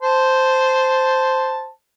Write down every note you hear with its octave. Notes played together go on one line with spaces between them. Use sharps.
C5 A5